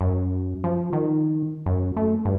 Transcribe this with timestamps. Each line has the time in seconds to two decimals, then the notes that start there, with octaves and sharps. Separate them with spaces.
0.01 F#2
0.64 F3
0.93 D#3
1.66 F#2
1.97 A3
2.25 G2